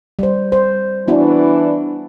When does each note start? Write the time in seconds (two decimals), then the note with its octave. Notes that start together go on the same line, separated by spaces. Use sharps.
0.19 G3 C5
0.52 C5
1.08 E3 B3 D4 E4 F#4